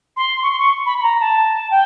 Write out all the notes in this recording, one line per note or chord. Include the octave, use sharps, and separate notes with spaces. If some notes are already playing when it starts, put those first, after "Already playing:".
C6
C#6
C6
C#6
B5
B5
A#5
A5
G5